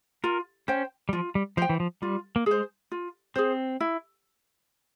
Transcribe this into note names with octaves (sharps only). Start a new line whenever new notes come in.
F4 A#4
C#4 C5 G5
G3
F3 F4
G3
F3 C5 G5
E3
F3
G3 F4
A#3
G#3 G#4 C5
F4
C4 G#4 C5
E4